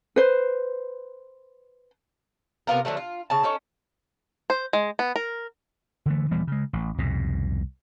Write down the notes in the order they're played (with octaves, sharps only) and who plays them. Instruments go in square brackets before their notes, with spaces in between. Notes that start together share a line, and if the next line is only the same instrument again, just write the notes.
[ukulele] B4 C5
[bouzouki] C3 B3 F4 A#4
D3 F3 F#3 A3
F4
C#3 A5
C#4 D#4 A4
[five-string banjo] C5
G#3
B3
A#4
[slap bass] D3 E3 A3
D#1 E3 G3 B3
C#3 G#3
A1
C2 F2 G#2 B2